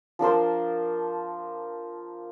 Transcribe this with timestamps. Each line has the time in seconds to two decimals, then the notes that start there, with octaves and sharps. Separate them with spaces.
0.19 F3 D4 A#4 C5